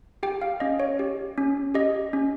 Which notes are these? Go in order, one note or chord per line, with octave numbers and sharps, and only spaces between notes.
G4 G5
F5
C#4 D#5
C#5
G4
C#4
G4 D#5
C#4